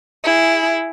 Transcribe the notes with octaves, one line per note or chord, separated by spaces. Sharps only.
E4 G#4